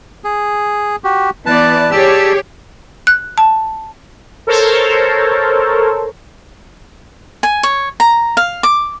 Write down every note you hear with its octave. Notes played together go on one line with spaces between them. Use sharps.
G#4
F#4 G4
E3 B3 B4 D5 A5
G4 G#4 C#5 D5 A5 E6
F#6
A5
A4 A#4 C5 C#5
G#5
C#5
A#5
F5
D6